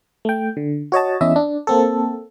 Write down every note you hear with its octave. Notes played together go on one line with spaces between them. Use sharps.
A3 G5
D3
F#4 C#5 D#5 A5
E2 C#4 E4 D#5 E5
D4
A#3 C4 A4